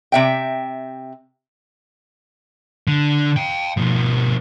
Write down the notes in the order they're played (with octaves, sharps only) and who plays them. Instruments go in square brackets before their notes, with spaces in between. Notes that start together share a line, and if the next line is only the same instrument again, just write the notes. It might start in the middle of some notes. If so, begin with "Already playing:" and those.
[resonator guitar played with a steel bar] C3 E5 G5
[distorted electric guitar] D3
F5 G5
B2 F3